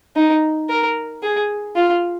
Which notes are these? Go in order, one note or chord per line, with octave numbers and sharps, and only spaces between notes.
D#4
A#4
G#4
F4